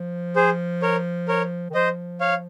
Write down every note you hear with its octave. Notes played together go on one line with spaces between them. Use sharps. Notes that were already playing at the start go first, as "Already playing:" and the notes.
Already playing: F3
G#4 C5
A#4 C#5
A#4 C#5
D#3
F3 C5 D#5
C#5 F5